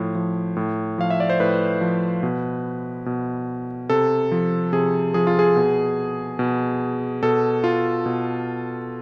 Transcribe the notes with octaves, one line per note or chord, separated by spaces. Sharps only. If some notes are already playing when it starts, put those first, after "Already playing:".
Already playing: A2 F3
F3
A2
F3 F5
E5
D5
C5
A2 B4
F3
B2
B2
C3 A4
F3
C3 G#4
F3 G#4
F4
G#4
B2
B2
B2 A4
F4
B2